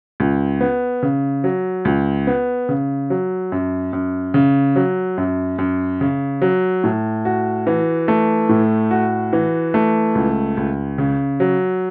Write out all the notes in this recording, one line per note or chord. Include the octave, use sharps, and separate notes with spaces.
C#2
B3
C#3
F#3
C#2
B3
C#3
F#3
F#2
F#2
C#3
F#3
F#2
F#2
C#3
F#3
A2
F#4
E3
A3
A2
F#4
E3
A3
C#2
C#2
C#3
F#3